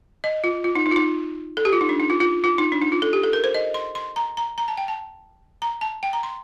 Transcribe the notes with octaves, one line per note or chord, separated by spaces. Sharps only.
D#5
F4
F4
D#4
D#4
F4
D#4
A4
G4
F4
D#4
D4
D#4
F4
F4
F4
D#4
D4
D#4
F4
A4
G4
A4
A#4
C5
D#5
C6
C6
A#5
A#5
A#5
A5
G5
A5
A#5
A5
G5
A#5
C6